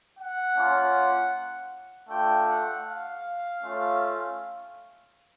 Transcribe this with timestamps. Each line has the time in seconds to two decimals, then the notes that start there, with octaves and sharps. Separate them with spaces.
0.18 F#5
0.55 A#3 C#4 F4
2.09 A3 D4 F4 G5
2.48 F#5
2.86 F5
3.63 A3 C#4 F4